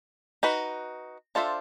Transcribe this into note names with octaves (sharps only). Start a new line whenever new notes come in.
D#4 F#4 B4
D4 F4 A4 C5 E5